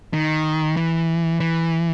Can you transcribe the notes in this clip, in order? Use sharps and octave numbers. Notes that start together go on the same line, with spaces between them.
D#3
E3
E3